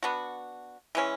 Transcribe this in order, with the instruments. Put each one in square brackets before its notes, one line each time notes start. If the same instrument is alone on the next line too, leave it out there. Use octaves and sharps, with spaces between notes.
[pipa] B3 D4 F#4
E3 G#3 C#4